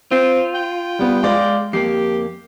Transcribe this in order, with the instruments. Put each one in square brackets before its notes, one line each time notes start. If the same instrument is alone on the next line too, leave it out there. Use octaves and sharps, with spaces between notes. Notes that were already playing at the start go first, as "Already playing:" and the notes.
[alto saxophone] C4 [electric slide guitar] F4
[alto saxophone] G5
[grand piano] G3 B3
G#3 D5 F5
[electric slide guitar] F2 A#3 [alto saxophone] G4 [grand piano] C7